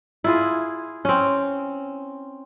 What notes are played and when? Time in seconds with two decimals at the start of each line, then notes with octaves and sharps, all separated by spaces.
0.24 E4 F4 G#4
1.05 C4 C#4